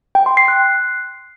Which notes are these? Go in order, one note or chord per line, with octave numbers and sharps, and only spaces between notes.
G5
C6
C7
F#6